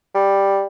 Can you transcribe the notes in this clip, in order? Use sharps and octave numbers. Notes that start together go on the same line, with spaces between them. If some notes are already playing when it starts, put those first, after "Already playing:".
G3